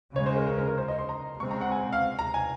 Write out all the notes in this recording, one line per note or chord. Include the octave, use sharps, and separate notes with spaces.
C#3 G#3 C#4 C#5
C5
A#4
A#4
A#4
A#4
C5
D#5
C6
A#5
C#3 G#3 C4 C#6
A#5
F#5
G#5
F5
A#5
G#5